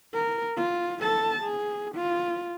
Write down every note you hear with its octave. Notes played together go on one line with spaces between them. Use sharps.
A#4
F4
A4 A5
G#4
F4